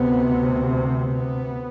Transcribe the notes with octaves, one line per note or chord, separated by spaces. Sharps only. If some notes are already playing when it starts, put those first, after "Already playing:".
Already playing: D2 C3 B3
B3